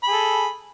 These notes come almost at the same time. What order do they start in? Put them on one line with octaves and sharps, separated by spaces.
B5 G#4 A4